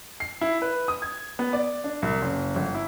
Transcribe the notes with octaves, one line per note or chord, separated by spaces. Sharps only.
C7
E4
B4
D#6
G#6
B3
D5
D4
C2
F#1
G1
E4